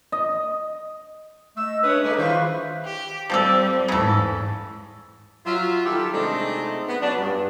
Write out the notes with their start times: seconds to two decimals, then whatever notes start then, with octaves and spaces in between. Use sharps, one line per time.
0.12 D#5
1.57 A3 D#5 E6
1.83 G#3 D4 B4 C#5 D#6
2.04 G3 A3 D#4 D6
2.18 D#3 F4 B4 C5 E5 F5 C#6
2.85 G4
3.30 F3 G3 C4 G4 A4
3.88 E2 G#2 C#3 A4
5.46 F#3 F4 E5
5.86 D#3 G3 E4 G4 A4
6.13 C3 G#3 A3 C4 D4 D#4
6.88 B3
7.02 F#3 B3 C#4 D4
7.19 G2